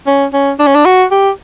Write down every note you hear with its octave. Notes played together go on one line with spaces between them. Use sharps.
C#4
C#4
D4
C#4
D4
F#4
G4